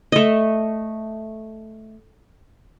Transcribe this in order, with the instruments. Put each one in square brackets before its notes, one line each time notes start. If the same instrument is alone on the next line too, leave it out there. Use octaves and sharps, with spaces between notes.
[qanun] A3 D#5